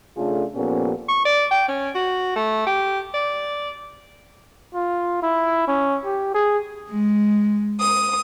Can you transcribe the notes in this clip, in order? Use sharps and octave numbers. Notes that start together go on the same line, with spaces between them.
C#3 A3 D4 F4 G#4 A4
A#2 F3 B3 C#4 G4 A4
C#6
D5
G5
C#4
F#4
A3
G4
D5
F4
E4
C#4
G4
G#4
G#3
D#6